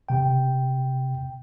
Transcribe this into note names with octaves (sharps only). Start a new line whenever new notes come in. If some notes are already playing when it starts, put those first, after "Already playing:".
C3 G5